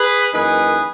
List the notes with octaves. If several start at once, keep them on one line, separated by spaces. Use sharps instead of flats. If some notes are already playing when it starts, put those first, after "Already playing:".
Already playing: G#4 B4
F#2 E3 A#3 D#4 G#4 B4